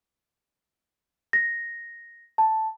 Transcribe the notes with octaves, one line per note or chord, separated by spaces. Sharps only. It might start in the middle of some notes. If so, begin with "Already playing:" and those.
A#6
A5